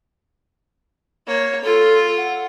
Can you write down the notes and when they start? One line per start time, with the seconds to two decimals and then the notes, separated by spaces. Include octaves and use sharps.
1.27 A#3 C#5
1.64 F4 A4
2.16 F#5